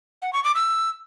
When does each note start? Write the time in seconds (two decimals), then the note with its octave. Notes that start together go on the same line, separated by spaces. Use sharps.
0.22 F#5
0.33 C#6
0.44 D6
0.55 E6